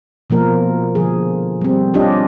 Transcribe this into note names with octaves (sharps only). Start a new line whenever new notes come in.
B2 F3 A#3 A#4
D3 F3 G#4
G3 C4
C#4 D4 F4 G4 D#5